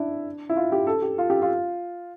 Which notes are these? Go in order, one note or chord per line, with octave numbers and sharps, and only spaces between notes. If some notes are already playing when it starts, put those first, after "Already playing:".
Already playing: D4 E4
E4
F4
G4
A4
G4
F4
G4
F4